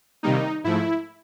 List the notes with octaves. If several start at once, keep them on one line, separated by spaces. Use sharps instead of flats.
C3 D#3 G3 A#3 D#4
G#2 F3 A3 E4